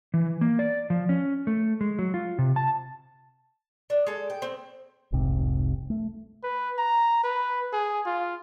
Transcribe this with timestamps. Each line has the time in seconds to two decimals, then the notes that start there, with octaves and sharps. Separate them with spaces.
0.14 E3
0.41 A#3
0.59 D5
0.90 F3
1.09 C#4
1.47 A3
1.81 G#3
1.99 F#3
2.14 F4
2.39 C3
2.56 A5
3.90 D4
4.07 G#3 A4
4.30 G5
4.42 C4
5.12 F1 C2 G#2 C3
5.90 A3
6.44 B4
6.79 A#5
7.24 B4
7.73 G#4
8.06 F4